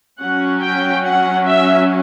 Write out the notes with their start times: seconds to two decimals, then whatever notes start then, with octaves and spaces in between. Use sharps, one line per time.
0.20 F#3 C#4 F#5
0.62 G5
1.04 F#5
1.46 E5